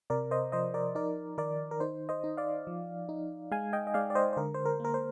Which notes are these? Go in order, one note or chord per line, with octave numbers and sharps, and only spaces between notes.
C3 A#4 D5
C5 D#5
F3 C5 D#5
A#4 D5
D#4 A#4 D5
D#3 A#4 D5
A#4
D#4 C5
C5 D#5
D#4
D5 F5
F3
D#4
G#3 F5 G#5
D#5 G5
D#5
G#3 D5 F5
D5
C5 D#5
C5
D3 A#4
C5
A#4
A#3 A#4
C5